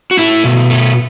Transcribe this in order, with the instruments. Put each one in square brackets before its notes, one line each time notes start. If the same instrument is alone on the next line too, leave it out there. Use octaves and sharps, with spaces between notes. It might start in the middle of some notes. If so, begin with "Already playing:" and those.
[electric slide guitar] F#4
A3 E4
B2
A3